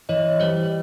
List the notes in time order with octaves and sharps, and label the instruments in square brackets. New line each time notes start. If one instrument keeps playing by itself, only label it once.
[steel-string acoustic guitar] E3 [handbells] C#5 D#5
[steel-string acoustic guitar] G3 [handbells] C5 D5